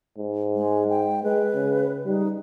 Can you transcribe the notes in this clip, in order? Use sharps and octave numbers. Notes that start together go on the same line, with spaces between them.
G#2
G#3
G5
G#3 B4
C#3
G3 D#4